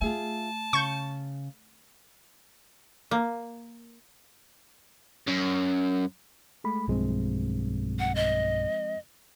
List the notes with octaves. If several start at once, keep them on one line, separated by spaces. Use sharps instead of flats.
A3 F4 G#4 E5 A5
C#3 C#6 G6
A#3
F#2
G#3 A3 B5
B1 G2 F3 G#3 C4
F#5
D#5